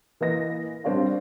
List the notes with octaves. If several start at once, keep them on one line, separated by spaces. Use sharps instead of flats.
E3 A#3 D#5 A#6
G3 C4 D4 G4 C#5 F5